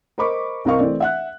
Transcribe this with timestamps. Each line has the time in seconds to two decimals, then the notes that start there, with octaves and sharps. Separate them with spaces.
0.18 A#4 C5 D#5 B5 C#6 D6
0.65 C2 C4 A#4 D#5 F5 C#6
0.78 E3 A3 C4 D5
1.00 E5 F#5 F#6